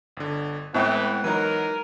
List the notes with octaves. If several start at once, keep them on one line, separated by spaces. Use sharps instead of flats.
G1 D3
A2 E3 G#3 B3 C4 E4 F#5 G5
E3 F#3 D#4 A#4 D#7